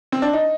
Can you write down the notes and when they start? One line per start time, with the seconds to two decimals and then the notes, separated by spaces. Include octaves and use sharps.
0.12 C4
0.22 D4
0.33 D#4